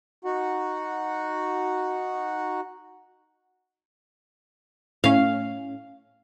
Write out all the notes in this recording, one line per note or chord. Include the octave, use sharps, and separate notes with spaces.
D#4 F#4 F#5
A2 C#4 F5